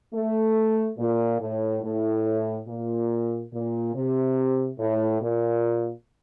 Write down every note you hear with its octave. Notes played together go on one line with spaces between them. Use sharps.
A3
A#2
A2
A2
A#2
A#2
C3
A2
A#2